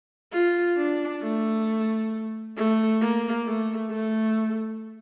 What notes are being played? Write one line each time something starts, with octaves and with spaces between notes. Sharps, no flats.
F4
D4
A3
A3
A#3
A3
A3